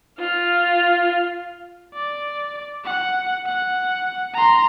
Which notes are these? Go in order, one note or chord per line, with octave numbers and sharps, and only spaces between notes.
F4 F5
D5
F#5
F#5
A#5 C6